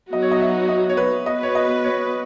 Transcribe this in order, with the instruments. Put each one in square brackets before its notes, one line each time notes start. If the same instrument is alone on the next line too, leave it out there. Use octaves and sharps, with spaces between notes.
[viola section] F#3 B3 D#4 F#4 [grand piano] D#5
[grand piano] C#5
D#5
E5
D#5
C#5
B4
[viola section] B3 F#4 B4 [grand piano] D#5
[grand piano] C#5
D#5
C#5